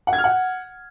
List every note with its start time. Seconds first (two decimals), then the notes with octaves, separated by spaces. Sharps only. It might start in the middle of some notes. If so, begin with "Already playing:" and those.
0.07 F#5
0.13 G#6
0.18 F6
0.24 F#5